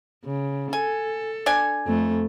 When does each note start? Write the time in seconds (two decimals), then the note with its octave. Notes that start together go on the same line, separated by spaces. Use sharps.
0.25 C#3
0.73 A4 G#5
1.46 D4 D5 G#5
1.86 F2 A3